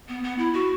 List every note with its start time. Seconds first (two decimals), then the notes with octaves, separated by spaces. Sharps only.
0.09 B3
0.24 B3
0.38 E4
0.54 F#4